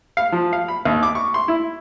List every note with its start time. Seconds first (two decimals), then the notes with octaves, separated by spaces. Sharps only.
0.17 F5
0.32 F3
0.53 F5
0.68 B5
0.85 D#2
1.03 D6
1.15 C#6
1.34 C6
1.48 E4